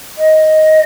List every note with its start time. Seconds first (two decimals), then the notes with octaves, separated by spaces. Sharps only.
0.18 D#5